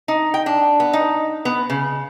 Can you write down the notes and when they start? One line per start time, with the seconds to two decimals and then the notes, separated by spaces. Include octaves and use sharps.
0.08 D#4
0.34 G5
0.46 D4
0.80 B3
0.93 D#4
1.45 B3
1.70 C#3